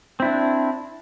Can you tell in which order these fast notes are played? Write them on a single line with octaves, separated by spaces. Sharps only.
C4 E4 D4